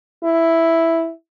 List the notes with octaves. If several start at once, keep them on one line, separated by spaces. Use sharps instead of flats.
E4